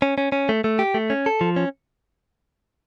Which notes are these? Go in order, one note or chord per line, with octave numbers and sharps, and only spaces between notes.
C#4
C#4
C#4
A3
A3
G4
A3
C#4
A4
F3
C#4